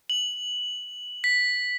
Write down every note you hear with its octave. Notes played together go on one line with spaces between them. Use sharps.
F#7
B6